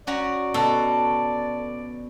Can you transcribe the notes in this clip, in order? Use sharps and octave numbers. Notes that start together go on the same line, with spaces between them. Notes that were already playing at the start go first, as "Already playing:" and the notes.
C#4 F#4 D5 A#5
B2 A4